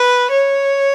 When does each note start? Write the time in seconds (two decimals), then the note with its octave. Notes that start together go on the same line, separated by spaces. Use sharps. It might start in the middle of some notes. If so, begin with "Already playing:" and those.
Already playing: B4
0.31 C#5